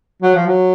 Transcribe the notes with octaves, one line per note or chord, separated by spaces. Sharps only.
F#3
F3
F#3